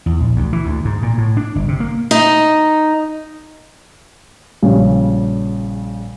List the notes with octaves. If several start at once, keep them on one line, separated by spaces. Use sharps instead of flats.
E2
A#1
D2
E3
D2
G#2
A#2
A2
D4
G1
C3
A#3
D#4
A#1 C#3 G3